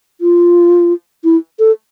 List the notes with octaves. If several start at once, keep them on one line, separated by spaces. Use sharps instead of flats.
F4
E4
A4